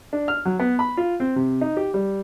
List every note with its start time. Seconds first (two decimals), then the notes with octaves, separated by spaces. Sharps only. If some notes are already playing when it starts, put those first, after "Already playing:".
0.13 D4
0.28 F6
0.45 F#3
0.60 B3
0.79 B5
0.97 F4
1.20 C4
1.36 C3
1.61 D#4
1.77 G4
1.94 G3